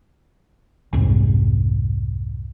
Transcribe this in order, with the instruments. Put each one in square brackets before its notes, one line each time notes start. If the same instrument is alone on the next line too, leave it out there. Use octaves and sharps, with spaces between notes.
[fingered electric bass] C2 F2 G#2 C3